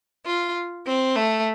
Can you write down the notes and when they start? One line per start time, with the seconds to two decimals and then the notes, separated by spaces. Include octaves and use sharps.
0.26 F4
0.86 C4
1.16 A3